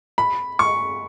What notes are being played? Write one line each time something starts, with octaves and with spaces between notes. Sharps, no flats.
B5
C#6